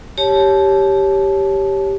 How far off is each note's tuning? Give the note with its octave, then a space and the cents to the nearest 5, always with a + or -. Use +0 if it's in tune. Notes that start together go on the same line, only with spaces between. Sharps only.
G4 +0 C#5 +0 A5 -25